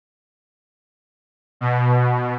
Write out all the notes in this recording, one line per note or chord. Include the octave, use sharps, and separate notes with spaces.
B2